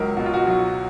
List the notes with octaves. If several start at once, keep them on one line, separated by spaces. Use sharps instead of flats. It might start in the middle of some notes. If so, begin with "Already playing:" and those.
Already playing: C#2 F#3 A#4
B2 F#4
F4
F#4
F#3